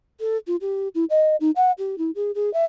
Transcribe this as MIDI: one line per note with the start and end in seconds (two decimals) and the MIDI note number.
0.20 0.37 69
0.47 0.56 65
0.61 0.88 67
0.95 1.04 64
1.10 1.36 75
1.40 1.51 63
1.56 1.72 78
1.78 1.98 67
1.98 2.10 64
2.15 2.31 68
2.35 2.52 68
2.53 2.65 76